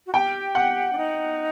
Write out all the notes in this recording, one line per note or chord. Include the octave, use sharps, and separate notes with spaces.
F#4
G4 G5
F#5
D4
D#4